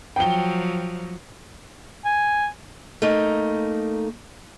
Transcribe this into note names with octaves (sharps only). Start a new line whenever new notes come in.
F3 F#3 G5 G7
G#5
A3 A#3 D#4